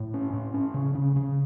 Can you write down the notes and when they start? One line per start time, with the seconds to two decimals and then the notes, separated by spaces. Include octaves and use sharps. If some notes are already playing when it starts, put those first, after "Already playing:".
Already playing: A2
0.14 C#4
0.33 A2
0.54 C#4
0.74 C#3
0.95 C#3
1.16 C#3